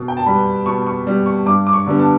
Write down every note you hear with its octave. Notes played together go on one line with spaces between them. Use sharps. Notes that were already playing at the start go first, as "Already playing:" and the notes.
Already playing: B2
G5
A5
G3 B3 B5
B2 C#6
C#6
G3 B3
C#6
G2 D6
D6
C#6
D3 G3 B3
A5